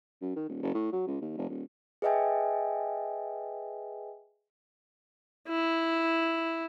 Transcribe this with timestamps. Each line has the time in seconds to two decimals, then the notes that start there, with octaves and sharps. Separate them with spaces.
0.22 F#2
0.36 D#3
0.49 D#1
0.63 F#1
0.74 A2
0.92 F#3
1.07 C#2
1.21 D#2
1.37 F1
1.50 D#1
2.02 G#4 B4 D#5 E5 G5 G#5
5.49 E4